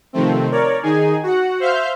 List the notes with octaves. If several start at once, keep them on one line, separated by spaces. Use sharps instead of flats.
C3 D#3 F3 A3 C4
A#4 C#5 D5
D#3 D#4 G#4 G#5
F#4 F#5
C5 E5 F5 F6 G6